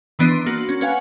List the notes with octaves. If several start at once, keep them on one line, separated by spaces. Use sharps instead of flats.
D#3 E3 B3 D4 C7 D#7
C6
A#3 F#4
C#4
C#4 B4 F5 F#5 G#5